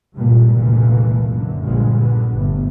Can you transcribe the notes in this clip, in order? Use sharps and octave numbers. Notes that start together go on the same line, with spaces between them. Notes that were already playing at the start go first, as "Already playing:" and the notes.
C#2 G2 A#2
F1 C#2 A#2 E3 A3 A#3
F#2 D3
A#1 G2 A#2 D3 G#3
D3 B3
G1 A3